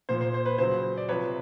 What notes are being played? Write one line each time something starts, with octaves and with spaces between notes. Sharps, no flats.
A#2 F3 C5
C5
C5
B4
C#3 F#3 C5
D5
C3 F3 B4 C#5